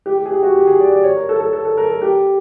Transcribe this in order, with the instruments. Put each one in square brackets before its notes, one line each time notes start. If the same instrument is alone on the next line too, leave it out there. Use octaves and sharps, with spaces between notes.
[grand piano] G4
G4
G#4
G4
F#4
G4
G#4
D5
D5
C#5
A#4
A4
A4
A4
A4
A#4
A4
G4